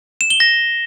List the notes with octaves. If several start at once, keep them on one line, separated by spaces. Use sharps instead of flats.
E7
G7
A#6